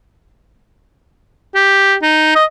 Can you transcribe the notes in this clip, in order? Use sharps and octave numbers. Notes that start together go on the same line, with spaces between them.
G4
D#4
D#5